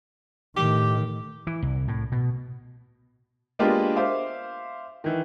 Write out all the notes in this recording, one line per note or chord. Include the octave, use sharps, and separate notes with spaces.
A2 D#3 G4
E3
C2
A2
B2
G#3 A#3 B3 D4 F4 G4
C5 E5 F5 D6
D#3 E3